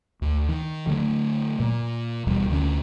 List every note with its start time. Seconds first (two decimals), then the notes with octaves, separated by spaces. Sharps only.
0.22 D2
0.49 D#3
0.87 D3 F#3 G3 A3
1.60 A#2
2.27 D#1 E2 B2 G3
2.49 D2 D3 C#4